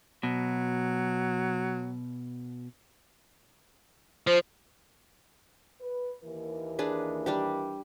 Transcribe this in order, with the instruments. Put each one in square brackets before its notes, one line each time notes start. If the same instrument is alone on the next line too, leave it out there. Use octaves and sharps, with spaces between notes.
[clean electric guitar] B2 [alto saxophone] F#3
[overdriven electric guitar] F3 [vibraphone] C5
[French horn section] B4
D#2 E3 A#4
[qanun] D4 G#4 B4
G3 D4 G4